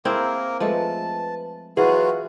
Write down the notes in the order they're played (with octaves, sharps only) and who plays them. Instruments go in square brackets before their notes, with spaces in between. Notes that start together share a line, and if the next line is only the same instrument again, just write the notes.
[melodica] A#3 A#4 [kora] C4 E4 G#4
[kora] F3 G#3 A3 [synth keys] B4 [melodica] A5
[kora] E3 [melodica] F#3 F4 F#4 [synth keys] G#4 [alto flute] B4